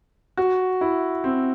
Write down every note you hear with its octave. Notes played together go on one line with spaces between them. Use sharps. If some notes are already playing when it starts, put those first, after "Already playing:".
F#4
E4
C4